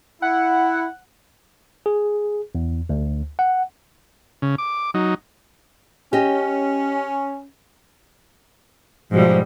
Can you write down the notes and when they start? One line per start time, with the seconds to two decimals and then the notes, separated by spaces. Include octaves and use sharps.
0.22 E4 F#5
1.86 G#4
2.55 E2
2.89 D2
3.39 F#5
4.42 C#3
4.58 D6
4.94 F#3 D#4
6.13 C#4 G4 D#5
9.11 G#2 B2 F3 G3